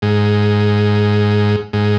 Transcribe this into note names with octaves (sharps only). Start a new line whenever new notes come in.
G#2
G#2